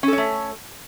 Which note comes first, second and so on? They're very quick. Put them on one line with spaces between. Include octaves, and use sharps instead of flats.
C#4 A4 C#5 A3